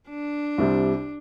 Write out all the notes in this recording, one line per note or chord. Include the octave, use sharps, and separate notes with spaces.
D4
C2 C3 G3